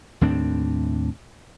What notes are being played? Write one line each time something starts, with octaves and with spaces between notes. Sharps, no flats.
D#2 A2 C4 D4